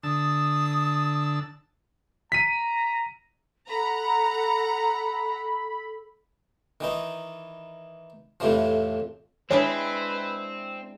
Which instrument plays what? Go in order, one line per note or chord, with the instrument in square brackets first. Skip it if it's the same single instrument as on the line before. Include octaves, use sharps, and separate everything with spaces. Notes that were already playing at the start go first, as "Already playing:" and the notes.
[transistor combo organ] D3 A5 E6 [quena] D#6
[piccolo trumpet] A#5 [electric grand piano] B6 D#7
[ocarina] A4 [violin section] F#5 A#5 [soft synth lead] B5
[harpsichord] D#3 E3 D#4
F2 A2 C3 E3 F3
[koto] G#3 D4 E4 [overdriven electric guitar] C4 [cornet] B4 [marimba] C#5